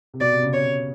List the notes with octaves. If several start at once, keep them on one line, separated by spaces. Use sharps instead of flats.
C3
B2 D5
C3
C#3
C#5